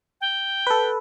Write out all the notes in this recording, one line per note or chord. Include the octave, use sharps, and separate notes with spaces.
G5
A4 B4